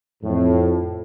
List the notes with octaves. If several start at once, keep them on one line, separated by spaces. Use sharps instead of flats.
F2 A2